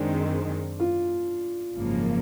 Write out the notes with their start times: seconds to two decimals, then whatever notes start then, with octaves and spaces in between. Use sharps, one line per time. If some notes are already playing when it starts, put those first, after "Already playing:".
Already playing: F#2 D#3 G#3 C4 D4
0.80 F4
1.74 G#1 F#2 C#3 F3 A#3